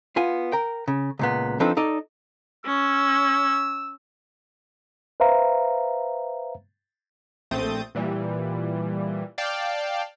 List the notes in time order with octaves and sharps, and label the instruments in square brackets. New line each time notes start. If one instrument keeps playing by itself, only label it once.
[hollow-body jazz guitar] B3 F4 G#5
A#4 G5
C#3
C#2 A#2 B3
F3 C4 D4 D#4 A4 B4
D#4 A4 D5 D#5
[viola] C#4 [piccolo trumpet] E6
[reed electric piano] B4 C5 E5 F5 A#5
[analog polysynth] A#1 A3 C4 D#6 G6 A6
A#2 E3 G3
D5 F5 G5 A5